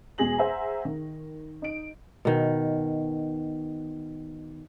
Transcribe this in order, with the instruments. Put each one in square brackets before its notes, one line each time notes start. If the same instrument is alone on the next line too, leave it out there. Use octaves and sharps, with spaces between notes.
[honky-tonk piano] E2 B2 G#3 G#4 A#6 F#7
G#4 C5 E5 F#5 G#5 A#5
D#3
D#4 D7
[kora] B2 D#3